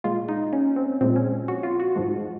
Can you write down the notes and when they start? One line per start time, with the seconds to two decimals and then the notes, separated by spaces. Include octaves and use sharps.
0.04 A#2 G#3 F4
0.29 D#4
0.53 C#4
0.76 C4
1.01 A#2 F3 G#3 C4
1.16 C#4
1.48 F#4
1.63 F4
1.80 F#4
1.96 G#2 F3 G#3